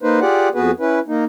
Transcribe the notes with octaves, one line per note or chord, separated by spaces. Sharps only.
A#3 D#4 B4 C5
F4 G4 G#4 D5 F#5
F2 B3 F#4 G#4 B4
C#4 E4 B4
A#3 D#4